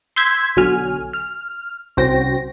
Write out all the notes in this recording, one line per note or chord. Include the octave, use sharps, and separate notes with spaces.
C6 E6 G6 G#6 B6
B1 D3 F#3 F#4 G#5 F6
F6
C2 C#4 F#4 C5 G5 A#6